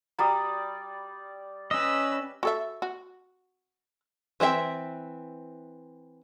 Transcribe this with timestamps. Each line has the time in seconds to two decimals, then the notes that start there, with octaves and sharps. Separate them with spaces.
0.19 G3 F#4 D5 F#5 A#5 D#6
1.71 C#4 B4 D#5 E6
2.43 F#4 A4 E5
2.82 F#4
4.40 E3 C4 D4 E5 G5